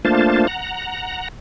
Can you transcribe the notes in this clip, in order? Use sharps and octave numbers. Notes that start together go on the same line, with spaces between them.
A3 A#3 D4 F4 C5 A5
F#5 A#5